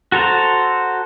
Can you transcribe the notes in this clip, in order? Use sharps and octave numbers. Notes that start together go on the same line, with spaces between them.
F#4 A4 C5 A#5